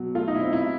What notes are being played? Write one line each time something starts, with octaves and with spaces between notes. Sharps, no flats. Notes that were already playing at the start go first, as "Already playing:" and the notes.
Already playing: B2 F#3
A3 F4
D#4
E4
C4
E4